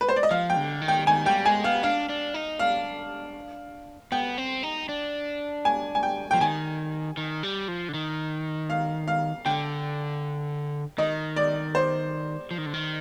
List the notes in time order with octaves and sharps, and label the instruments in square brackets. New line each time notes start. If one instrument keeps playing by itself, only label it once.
[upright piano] B4
C5
D5
D#5
[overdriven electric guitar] F3 [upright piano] F5
[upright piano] G5
[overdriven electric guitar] D3
D#3
[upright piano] G5
[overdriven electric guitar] D#3 [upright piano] G#5
[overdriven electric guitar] G3 [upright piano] G5
[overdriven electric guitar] G#3 [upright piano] G#5
[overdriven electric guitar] B3 [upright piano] F5
[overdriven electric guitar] D4 [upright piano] F5
[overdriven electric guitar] D4
D#4
[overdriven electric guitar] D4 [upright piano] F5
[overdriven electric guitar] B3 [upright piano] G5
[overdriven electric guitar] C4
D#4
D4
[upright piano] G#5
G#5
G5
[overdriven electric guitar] F3 [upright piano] G5
[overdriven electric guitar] D#3 [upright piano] G#5
[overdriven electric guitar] D#3
G3
F3
D3
D#3
[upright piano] F5
F5
[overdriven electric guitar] D3 [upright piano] G5
[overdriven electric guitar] D#3 [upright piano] D#5
[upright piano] D5
C5
[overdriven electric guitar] F3
D#3
D3
D#3